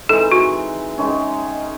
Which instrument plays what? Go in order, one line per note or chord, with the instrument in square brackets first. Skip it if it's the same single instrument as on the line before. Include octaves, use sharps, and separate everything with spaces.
[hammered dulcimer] E3 G#3 C4 D#4 [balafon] A4
[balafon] F#4
[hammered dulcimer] D#3 G#3 C#4